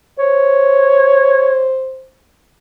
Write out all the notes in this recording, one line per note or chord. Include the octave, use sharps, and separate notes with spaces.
C5 C#5